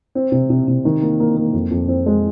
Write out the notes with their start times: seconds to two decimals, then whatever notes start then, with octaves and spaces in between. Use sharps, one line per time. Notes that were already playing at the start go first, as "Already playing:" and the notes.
0.15 C4
0.32 C3
0.50 C3
0.68 C3
0.85 D#3
1.02 A#3
1.20 A#3
1.37 A#3
1.53 F2
1.71 F2
1.88 C4
2.06 G#3